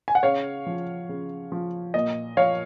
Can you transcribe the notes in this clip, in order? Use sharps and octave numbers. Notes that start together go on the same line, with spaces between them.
G#5
F#5
C#3 C#5 F5
F3
C#3
F3
A#2 D#5
F3 C#5 F5